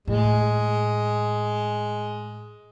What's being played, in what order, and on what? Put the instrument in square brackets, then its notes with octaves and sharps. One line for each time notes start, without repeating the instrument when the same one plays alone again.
[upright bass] A2 [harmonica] G#3